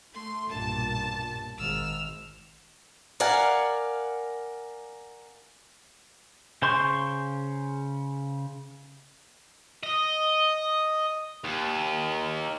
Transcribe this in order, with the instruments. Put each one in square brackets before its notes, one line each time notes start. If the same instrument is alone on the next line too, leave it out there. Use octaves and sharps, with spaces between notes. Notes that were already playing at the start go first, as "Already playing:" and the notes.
[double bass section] A3 [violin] C6
[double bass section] B1 G2 A#2 [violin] A5
[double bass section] G#1 [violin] E6 F6
[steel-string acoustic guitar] A#4 D5 F5 F#5 G#5
[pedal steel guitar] C#3 C5 C6 C#6 G6
[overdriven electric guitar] D#5
D#2